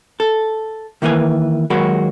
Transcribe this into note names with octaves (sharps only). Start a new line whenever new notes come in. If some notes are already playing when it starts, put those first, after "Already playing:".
A4
D#3 E3 A#3 B4 G#5
D#2 F#3 G#3 F#4 A#4 B5